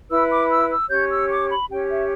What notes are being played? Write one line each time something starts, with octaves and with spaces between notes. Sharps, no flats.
E4 B4 E6
D6
E6
E6
C#4 G4 C#5 G6
E6
D6
B5
C#4 G4 C#5 G5
E5